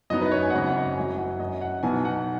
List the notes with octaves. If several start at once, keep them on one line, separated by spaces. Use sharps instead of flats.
F#2 F#3 B3 D#4 D#5
B4
C#5
G#5
F#5
G#1 F#2 C#3 D#5
F#5
F#1 F#2 F#3 G#5
F#5
F#2 F#3 C#4 D#5
F#5
B1 B2 B3 D#4 G#5
F#5